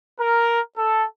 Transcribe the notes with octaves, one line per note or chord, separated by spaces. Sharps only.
A#4
A4